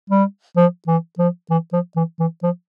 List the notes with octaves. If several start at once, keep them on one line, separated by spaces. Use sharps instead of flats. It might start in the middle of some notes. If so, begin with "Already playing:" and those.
G3
F3
E3
F3
E3
F3
E3
E3
F3